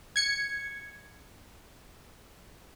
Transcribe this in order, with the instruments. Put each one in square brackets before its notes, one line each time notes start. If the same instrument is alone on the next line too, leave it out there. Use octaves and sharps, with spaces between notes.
[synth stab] G#6 C#7